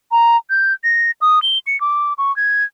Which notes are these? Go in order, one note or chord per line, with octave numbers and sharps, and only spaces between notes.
A#5
G6
A#6
D#6
G7
C#7
D6
C#6
G#6